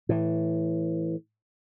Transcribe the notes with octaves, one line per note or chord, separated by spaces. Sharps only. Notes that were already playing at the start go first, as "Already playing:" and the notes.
A2 E3